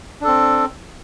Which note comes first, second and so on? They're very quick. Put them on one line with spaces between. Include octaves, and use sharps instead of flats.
D4 A4 C4